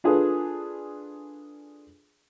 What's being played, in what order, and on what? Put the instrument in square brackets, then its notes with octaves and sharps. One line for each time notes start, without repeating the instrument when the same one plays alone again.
[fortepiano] D4 F4 G#4 A4 B4